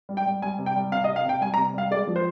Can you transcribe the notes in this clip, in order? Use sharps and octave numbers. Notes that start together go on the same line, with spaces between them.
G3
G5
G3
G3 G#5
C3
G5
G3
C3 F5
D#5
C3
F5
C3 G5
G3 G#5
A#5
C3
G3 F5
G#3 D5
F3
C5